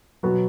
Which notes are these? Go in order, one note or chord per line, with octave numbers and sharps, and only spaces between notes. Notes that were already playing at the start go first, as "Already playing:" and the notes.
B2 F#3 B3 F#4